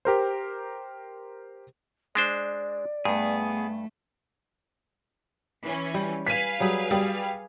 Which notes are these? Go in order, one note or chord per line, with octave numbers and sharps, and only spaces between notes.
G4 A#4 C5
G#3 D4 C5 D5
G2 A3 B3 G#4
E3 C#4
G3
B4 F5 G#5 B6 D#7
F#3 G3 G#4
G3 G#4